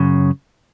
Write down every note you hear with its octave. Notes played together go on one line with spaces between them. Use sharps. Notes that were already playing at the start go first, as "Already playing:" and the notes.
Already playing: F#2 C#3